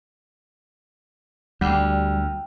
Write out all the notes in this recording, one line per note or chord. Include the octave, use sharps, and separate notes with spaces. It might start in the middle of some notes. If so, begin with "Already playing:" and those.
D2 G3 F#5 G5